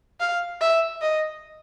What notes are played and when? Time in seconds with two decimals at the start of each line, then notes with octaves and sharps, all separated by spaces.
0.20 F5
0.61 E5
1.02 D#5